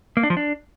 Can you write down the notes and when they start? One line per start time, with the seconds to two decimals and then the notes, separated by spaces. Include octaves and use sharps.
0.17 A#3
0.23 D4
0.30 F3
0.37 D4